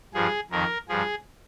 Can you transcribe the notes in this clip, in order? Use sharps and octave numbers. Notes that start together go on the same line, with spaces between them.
G2 F3 G#4
F2 D#3 A#4
G2 F3 G#4